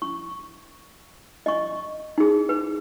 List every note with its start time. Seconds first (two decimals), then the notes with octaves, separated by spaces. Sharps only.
0.02 C#6
1.46 D#5 C#6
2.18 D#4 G#4
2.49 B4